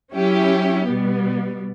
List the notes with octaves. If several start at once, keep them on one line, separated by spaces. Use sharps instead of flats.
F#3 C#4 E4 G4
B2 G3 B3